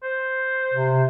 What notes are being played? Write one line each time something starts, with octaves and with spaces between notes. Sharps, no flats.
C5
C3